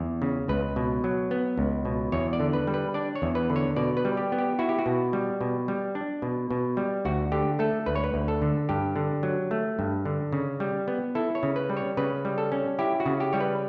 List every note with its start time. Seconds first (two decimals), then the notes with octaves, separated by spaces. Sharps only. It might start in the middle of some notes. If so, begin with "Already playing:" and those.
Already playing: E2
0.22 C#3
0.48 C#2 B4
0.76 B2
1.04 F#3
1.31 B3
1.58 C#2
1.85 B2
2.12 E2 C#5
2.33 D5
2.40 D3
2.53 B4
2.67 G3
2.74 B4
2.94 D4 D5
3.15 C#5
3.22 E2
3.35 B4
3.50 D3
3.56 C#5
3.76 B2 D5
3.97 B4
4.05 G3
4.17 G4
4.32 B3
4.38 G4
4.59 E4 F#4
4.69 G4
4.79 F#4
4.86 B2
5.13 G3
5.41 B2
5.68 G3
5.95 D4
6.22 B2
6.51 B2
6.77 G3
7.05 D2 F#4
7.32 D3 G4
7.59 A3 A4
7.86 D2 B4
7.96 C#5
8.04 B4
8.14 D2
8.28 A4
8.42 D3
8.69 G2 G4
8.96 D3
9.23 F#3
9.51 A3
9.79 G2
10.05 D3
10.33 C#3
10.60 G3
10.88 B3
11.15 E4 A4
11.35 C#5
11.43 C#3
11.56 B4
11.69 G3
11.77 C#5
11.97 C#3 B4
12.25 G3
12.38 A4
12.52 C#4
12.79 E4 G4
13.00 F#4
13.06 C#3
13.20 G4
13.33 G3 C#5
13.40 B4